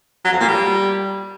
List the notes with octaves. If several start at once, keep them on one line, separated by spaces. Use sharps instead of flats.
F#3
F2
A#2
G3